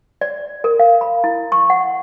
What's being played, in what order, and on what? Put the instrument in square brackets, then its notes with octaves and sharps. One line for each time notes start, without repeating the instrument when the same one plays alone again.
[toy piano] D5
A#4
F5
B5
E4
C#6
F#5